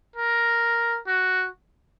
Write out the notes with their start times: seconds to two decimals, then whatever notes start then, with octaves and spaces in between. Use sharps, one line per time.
0.16 A#4
1.07 F#4